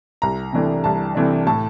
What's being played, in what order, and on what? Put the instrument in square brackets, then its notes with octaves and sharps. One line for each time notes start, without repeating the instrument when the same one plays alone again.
[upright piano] C2 A#5
C3 E3 A3 D4
C2 A5
C3 E3 A3 D4
A2 A5